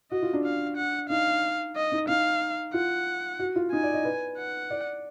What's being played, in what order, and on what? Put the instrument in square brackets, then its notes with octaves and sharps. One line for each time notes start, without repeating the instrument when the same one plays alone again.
[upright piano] F#4 [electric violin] D#5
[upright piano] F4
D4
[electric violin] F5
F#5
[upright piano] D#4 [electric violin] F5
[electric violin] D#5
[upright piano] D#4
[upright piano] D#4 [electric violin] F5
[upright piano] F4 [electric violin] F#5
[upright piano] F#4
F4
[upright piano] D#4 [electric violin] G#5
[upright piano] D5
D#5
B4
[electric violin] F#5
[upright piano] D5